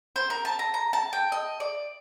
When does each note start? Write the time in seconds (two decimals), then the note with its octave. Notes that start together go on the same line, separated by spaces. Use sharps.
0.16 C5
0.30 A#4
0.45 A5
0.59 A#5
0.74 A#5
0.93 A5
1.13 G5
1.32 D#5
1.60 D5